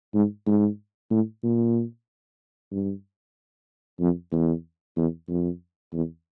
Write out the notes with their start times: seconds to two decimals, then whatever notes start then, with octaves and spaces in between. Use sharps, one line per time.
0.14 G#2
0.46 G#2
1.10 A2
1.43 A#2
2.71 G2
4.00 F2
4.32 E2
4.97 E2
5.29 F2
5.93 E2